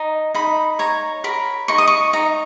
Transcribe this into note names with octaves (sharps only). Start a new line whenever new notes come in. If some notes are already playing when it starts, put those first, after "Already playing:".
Already playing: D#4
D#4 B5
C#5 A#5
A#4 B5
D#4 C#6
D#6
C#6
D#4 A#5